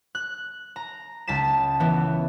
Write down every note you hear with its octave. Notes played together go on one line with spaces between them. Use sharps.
F#6
A#5
C#2 A5 B6 E7
E3 B3